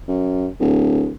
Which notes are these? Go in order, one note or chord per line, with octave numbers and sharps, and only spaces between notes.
F#2
D1